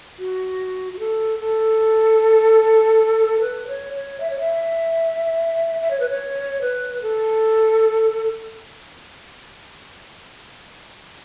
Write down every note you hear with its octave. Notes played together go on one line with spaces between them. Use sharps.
F#4
F#4
A4
A4
B4
C#5
C#5
E5
C#5
E5
E5
C#5
B4
C#5
B4
A4